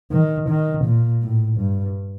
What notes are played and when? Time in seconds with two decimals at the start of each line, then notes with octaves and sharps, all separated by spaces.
0.12 D#3
0.49 D#3
0.85 A#2
1.22 A2
1.59 G2